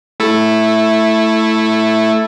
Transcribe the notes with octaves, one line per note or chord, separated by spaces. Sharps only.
A3 E4 A4